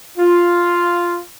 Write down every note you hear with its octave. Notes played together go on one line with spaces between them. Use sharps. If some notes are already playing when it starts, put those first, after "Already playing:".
F4